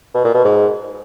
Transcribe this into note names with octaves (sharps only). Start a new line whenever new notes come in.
B2
A#2
B2
G#2